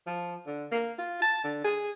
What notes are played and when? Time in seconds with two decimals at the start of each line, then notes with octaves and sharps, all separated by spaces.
0.06 F3
0.47 D3
0.72 A#3
0.98 F4
1.22 A5
1.44 D3
1.65 G#4